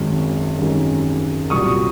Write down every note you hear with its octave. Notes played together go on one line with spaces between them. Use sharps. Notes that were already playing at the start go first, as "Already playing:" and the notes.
Already playing: G#1 F#2 D#3 G#3 C#4
G#1 F#2 D#3 G#3 C#4
C2 A#2 F#3 C#6 D#6